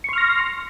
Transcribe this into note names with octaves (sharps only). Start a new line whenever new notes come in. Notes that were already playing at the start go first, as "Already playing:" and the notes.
C6 C#6 F6 A#6